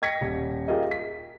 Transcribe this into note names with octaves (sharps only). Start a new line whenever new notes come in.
D#5 G5 G#6 A#6 B6 C#7
D#1
F4 G4 G#4 A#4 D#5 E5
B6